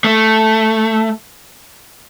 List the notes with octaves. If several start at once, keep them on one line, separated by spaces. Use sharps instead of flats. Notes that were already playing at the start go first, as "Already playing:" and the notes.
A3